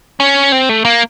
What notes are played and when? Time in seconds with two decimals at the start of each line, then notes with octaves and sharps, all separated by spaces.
0.20 C#4
0.52 C4
0.69 A3
0.85 A#3